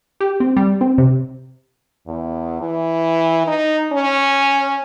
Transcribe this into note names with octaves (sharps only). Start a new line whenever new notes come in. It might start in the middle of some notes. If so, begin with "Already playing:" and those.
G4
C4
G3
C4
C3
E2
E3
D#4
C#4